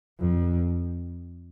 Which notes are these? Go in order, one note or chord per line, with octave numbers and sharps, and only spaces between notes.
F2